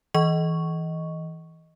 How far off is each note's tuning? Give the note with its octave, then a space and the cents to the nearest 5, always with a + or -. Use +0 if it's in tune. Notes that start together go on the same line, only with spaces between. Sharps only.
E3 -20 D#5 +0 C#6 +0